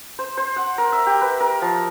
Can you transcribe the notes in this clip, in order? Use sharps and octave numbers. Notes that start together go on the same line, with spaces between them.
C5
C5
F#5
A#4
E5
G4
B4
A#4
F3